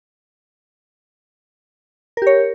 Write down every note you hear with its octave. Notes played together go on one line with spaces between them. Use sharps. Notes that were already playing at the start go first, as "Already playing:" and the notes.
G4 A#4 C#5